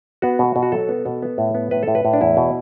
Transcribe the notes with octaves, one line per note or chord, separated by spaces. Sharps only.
B3 F#4
B2
B2
F#4
F#3 A4
B3
B2
B3
A2
B3
A2 B4
A4
A2
B4
A2
D4
E2 E4
B2